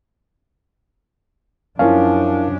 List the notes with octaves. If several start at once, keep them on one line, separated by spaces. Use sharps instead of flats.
F#2 F3 C#4 D4 E4 A#4 F5